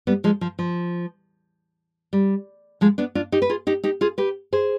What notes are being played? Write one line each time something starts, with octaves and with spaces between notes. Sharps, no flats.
G3 B3
F3 G#3
F3
F3
G3
F3 G#3
B3 D4
D4 F4
D#4 G4
B4
F4 G#4
D#4 G4
D#4 G4
F4 G#4
G4 B4
G#4 C5